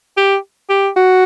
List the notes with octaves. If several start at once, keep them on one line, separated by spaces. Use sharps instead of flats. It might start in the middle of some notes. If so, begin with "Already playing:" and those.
G4
G4
F#4